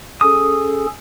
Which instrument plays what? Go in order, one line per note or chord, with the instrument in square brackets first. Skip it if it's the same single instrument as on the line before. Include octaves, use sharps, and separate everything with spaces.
[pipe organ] C#4 G#4 A4 [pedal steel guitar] D#6